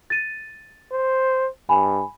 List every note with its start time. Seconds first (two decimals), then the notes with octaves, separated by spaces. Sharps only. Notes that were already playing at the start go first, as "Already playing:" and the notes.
0.10 A6 D#7
0.92 C5
1.69 G2 G#5 B5